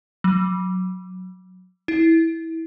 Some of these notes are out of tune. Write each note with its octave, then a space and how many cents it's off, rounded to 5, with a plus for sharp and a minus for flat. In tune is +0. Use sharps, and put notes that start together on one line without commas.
F#3 -5
E4 -15